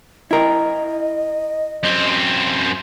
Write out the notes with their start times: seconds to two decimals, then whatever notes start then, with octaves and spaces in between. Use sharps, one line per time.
0.31 E4 A#4 D#5
1.83 F#2 C4